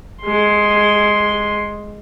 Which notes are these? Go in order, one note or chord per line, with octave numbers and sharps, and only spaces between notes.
G#3 C6